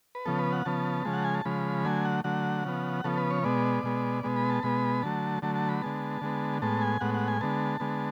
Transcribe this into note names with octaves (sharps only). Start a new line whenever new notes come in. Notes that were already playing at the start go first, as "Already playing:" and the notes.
B4
C#3 F3 B3 A4
B4
F#5
C#3 F3 B3 A5
C#3 F3 G#3
F#5
G#5
A5
C#3 F3 G#3 B5
D3 F#3 A3 G#5
F#5
D3 F#3 A3 F#5
C#3 F3 B3
C#3 F3 B3 A4
B4
C#5
B2 G#3 B3 D5
B2 G#3 B3
B2 G#3 B3
B5
A5
B2 G#3 B3 B5
D3 F#3 A3 A5
D3 F#3 A3 A5
A5
B5
D3 G#3 B3 A5
D3 G#3 B3
A2 G#3 B3 A5
G#5
A2 G#3 B3 F#5
F#5
G#5
D3 G#3 B3 A5
D3 G#3 B3